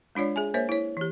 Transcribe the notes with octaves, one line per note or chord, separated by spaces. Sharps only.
G#3 D4 F4 C#5 D5
G#4 E5 G#5
A#3 A#4 C5 C#5 E5
E4 C#5
E3 G4